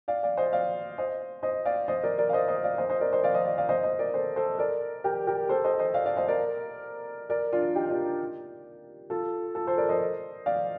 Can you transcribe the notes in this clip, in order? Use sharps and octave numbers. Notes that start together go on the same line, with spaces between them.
D5 F5
D5 F5
C5 D#5
D5 F5
C5 D#5
C5 D#5
D5 F5
C5 D#5
A#4 D5
A#4 D5
F5
C5 D#5
C5 D#5
D5 F5
C5 D#5
C5 D#5
A#4 D5
C5 D#5
D5 F5
C5 D#5
D5 F5
D5 F5
C5 D#5
C5 D#5
A#4 D5
A4 C5
A4 C5
A#4 D5
G4 A#4
G4 A#4
A4 C5
C5 D#5
C5 D#5
D5 F5
D5 F5
C5 D#5
A#4 D5
A#4 D5
D4 F4
D#4 G4
D4 F4
F4 A4
F4 A4
A4 C5
A#4 D5
C5 D#5
D5 F5